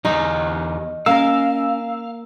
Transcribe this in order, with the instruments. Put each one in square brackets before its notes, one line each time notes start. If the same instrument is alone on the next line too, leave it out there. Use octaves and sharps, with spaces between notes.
[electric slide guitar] E2 G4 D#5 [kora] D#4
[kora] A#3 A#4 [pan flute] C#4 [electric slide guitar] F5 [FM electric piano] E6